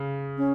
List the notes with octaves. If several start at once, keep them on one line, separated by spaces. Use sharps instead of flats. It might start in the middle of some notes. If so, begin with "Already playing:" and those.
Already playing: C#3
C#4